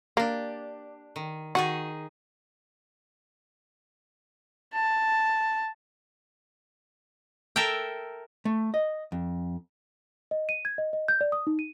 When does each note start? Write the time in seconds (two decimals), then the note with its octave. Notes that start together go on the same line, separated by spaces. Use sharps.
0.17 A#3 D4 G4
1.16 D#3
1.55 D#3 D#4 F#4 G#4
4.74 A5
7.56 A4 A#4 E5 G5
8.45 A3
8.74 D#5
9.12 F2
10.31 D#5
10.49 D#7
10.65 G#6
10.78 D#5
10.93 D#5
11.08 G6
11.21 D5
11.32 D#6
11.47 D#4
11.59 D#7